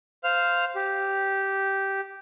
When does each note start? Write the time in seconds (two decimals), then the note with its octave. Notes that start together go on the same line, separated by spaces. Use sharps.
0.24 C5 F5 F6
0.75 G4